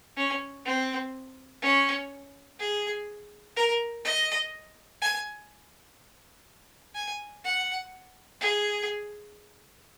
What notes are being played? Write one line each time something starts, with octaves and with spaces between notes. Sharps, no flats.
C#4
C4
C#4
G#4
A#4
D#5
G#5
G#5
F#5
G#4